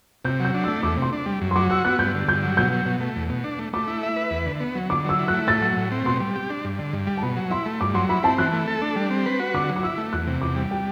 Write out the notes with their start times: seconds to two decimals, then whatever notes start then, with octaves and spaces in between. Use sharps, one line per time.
0.25 C3 G6
0.40 F#3 G6
0.54 D4
0.64 E6
0.68 A3
0.83 E2 D6
0.97 C3
1.02 C6
1.13 D4
1.26 G3
1.41 F#2
1.51 C6
1.56 F#3 D6
1.70 F#4 E6
1.85 B3 F#6
1.99 G2 G6
2.14 D3
2.28 G2 G6
2.43 F#3
2.57 B2 G6
2.72 F#3
2.86 B2
3.00 A3
3.16 E2
3.29 B2
3.44 D4
3.59 A3
3.73 A3 D6
3.88 E4
4.03 E5
4.16 B4
4.31 E2
4.46 D3
4.60 B3
4.75 F#3
4.90 D3 D6
5.05 F#3 E6
5.19 E4
5.28 F#6
5.33 A3
5.47 A2 A6
5.62 F#3
5.77 A2
5.92 C4
6.05 B2 C6
6.21 G3
6.36 G4
6.50 D4
6.65 G2
6.79 D3
6.93 G2
7.07 G3
7.17 A5
7.22 B2 B5
7.37 F#3
7.51 E4 C6
7.66 A3
7.81 G2 D6
7.94 F#3 C6
8.09 E4 B5
8.23 C4 A5
8.38 E3 F#6
8.53 A3
8.68 A4
8.82 D4
8.96 G3
9.11 C4
9.26 B4
9.40 F#4
9.54 D3 D6
9.69 F#3
9.76 D6
9.83 E4 E6
9.98 A3
10.13 E2 F#6
10.27 C3
10.41 E2 D6
10.56 G3
10.71 G5